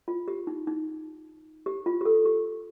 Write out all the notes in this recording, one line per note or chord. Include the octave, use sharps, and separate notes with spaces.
F4
G4
D#4
D#4
G4
F4
G4
A4
G4